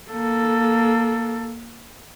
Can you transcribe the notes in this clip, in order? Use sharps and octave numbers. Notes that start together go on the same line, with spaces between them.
A#3 A4